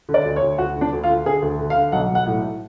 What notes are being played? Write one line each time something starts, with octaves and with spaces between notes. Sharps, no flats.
D3
D5
D2
C#5
D2
D2 F#4
D3
D4
D2
F4
D3
D3 G#4
D2
D3
F5
D3
B1 F#5
B1
F#5
A2
A2